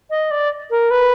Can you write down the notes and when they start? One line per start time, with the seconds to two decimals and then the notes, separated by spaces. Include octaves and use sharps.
0.10 D#5
0.31 D5
0.70 A#4
0.90 B4